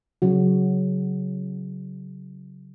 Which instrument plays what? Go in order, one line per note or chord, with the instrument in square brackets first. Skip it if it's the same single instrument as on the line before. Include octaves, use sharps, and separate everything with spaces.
[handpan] C#3 F#3 F#4